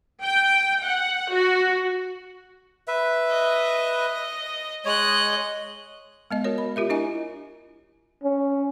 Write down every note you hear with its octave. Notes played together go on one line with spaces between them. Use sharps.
G5
F#5
F#4
B4 E5
D#5
G#3 C#5 D#5 F#6
G#3 B3 D#5
F#4 A#4 C#5
B5
F4 G4 A#4 E5
D4 E4 D#5 G#5
C#4